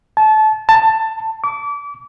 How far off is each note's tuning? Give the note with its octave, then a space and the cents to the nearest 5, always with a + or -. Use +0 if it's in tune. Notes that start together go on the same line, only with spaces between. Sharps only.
A5 -25
A5 +15
D6 -30